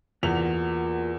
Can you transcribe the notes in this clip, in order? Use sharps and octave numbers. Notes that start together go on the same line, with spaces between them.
E2 A#3 F4 F#4 F7